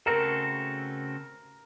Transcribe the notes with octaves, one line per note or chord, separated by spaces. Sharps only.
C#3 A3 C4 F#4 A4 A#4